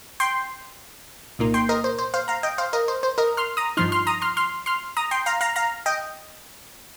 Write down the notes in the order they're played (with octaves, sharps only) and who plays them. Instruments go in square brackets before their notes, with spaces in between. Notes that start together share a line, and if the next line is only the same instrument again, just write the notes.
[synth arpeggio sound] G5 C6
C2 A#2 A#3 D#4
G5 C6
A#4 D#5
C5
C5
C5 F5
F5 A#5
D#5 G5
C5 F5
A#4 D#5
C5
C5
A#4 D#5
C6 F6
A#5 D#6
G2 F3 D#4 C6 F6
C6 F6
A#5 D#6
C6 F6
C6 F6
C6 F6
A#5 D#6
G5 C6
F5 A#5
F5 A#5
F5 A#5
D#5 G5